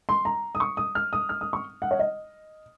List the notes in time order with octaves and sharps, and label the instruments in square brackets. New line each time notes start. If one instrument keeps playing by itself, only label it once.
[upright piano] C6
A#5
D#6
C#6
D#6
F6
D#6
F6
D#6
C#6
F#5
C#5
D#5